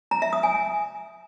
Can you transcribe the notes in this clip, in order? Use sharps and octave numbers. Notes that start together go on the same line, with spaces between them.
A#5
E5
D#6
G#5